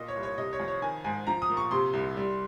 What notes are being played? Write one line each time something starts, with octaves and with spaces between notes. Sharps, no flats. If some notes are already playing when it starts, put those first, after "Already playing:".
Already playing: A#2 D#5
C#5
C2
C#5
C3 D#5
C#5
F2
C#5
D#3 G#5
G#2 G#5
F3 A#5
D#6
A#2
C#6
C3 C6
C2
G3